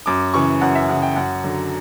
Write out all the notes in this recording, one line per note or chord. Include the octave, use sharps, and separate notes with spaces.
F#2 D6
C#3 E3 C#6
F#2 F#5
E5
C#3 E3 F#5
G5
F#2 F#5
D3 F#3